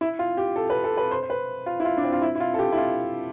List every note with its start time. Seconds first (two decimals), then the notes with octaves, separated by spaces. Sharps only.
0.01 E4
0.19 F4
0.37 G4
0.56 A4
0.70 B4
0.84 A4
0.97 B4
1.11 C5
1.23 C5
1.30 B4
1.66 F4
1.80 E4
1.85 F4
1.97 D4
2.03 C4
2.13 F4
2.22 E4
2.35 E4
2.40 F4
2.54 A4
2.59 G4
2.72 E4
2.77 F4